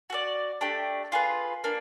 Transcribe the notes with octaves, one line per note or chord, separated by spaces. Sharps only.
F#4 A4 D5
A3 D4 G4
F4 G#4 B4
A#3 D4